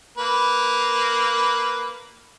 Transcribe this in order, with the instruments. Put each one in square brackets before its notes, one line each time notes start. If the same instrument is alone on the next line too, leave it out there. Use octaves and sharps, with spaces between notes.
[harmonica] A#3 B4